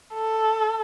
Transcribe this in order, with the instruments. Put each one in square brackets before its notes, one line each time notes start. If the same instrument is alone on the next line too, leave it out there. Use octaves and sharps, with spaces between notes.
[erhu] A4